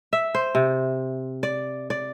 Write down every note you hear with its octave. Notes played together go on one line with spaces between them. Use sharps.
E5
C5
C3
D5
D5